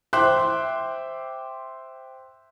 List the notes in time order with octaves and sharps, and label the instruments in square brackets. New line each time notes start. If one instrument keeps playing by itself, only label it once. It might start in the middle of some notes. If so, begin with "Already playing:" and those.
[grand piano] C5 E5 G5 C6 D6 F#6